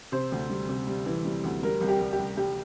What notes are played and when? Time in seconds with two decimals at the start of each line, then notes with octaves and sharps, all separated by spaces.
0.12 C3 C5
0.32 D2
0.50 G3
0.69 C3
0.87 G3
1.06 E3
1.25 G3
1.44 D2
1.63 G3 A#4
1.81 C2
1.88 G4
2.01 C2
2.13 G4
2.19 C2
2.37 G3 G4